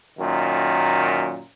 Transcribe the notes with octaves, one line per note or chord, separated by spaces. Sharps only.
F#2 A#2 D#3